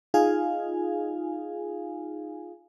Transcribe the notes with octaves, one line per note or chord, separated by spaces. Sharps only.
D#4 F4 G#4 F5 G#5